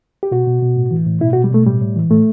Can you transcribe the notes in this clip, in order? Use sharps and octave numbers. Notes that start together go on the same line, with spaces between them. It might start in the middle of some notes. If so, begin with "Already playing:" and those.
G4
B2 F#4
B2
B2
A2
E3
A2
B2 E4
B2 F#4
G3
B2 A3
A2 G3
A2
E3
A2 A3